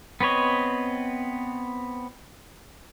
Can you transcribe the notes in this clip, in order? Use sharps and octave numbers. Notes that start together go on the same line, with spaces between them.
B3 C4 B4 C#5 D#5